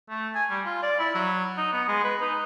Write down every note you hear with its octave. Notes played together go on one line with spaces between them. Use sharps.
A3
G#5
G3
F4
D5
E4
F#3
D#4
B3
G#3
B4
D#4